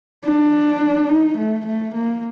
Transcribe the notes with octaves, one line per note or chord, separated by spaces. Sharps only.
D4
D#4
A3
A3
A#3